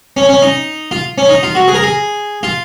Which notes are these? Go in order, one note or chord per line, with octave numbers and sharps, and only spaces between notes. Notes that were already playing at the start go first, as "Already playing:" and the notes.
C#4
C#4
D#4
F4
C#4
D#4
F4
F#4
G#4
A#4
G#4
F4